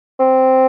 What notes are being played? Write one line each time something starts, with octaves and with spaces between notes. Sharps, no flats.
C4